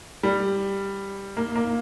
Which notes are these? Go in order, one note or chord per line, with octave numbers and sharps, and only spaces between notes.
G3
A#3
A#3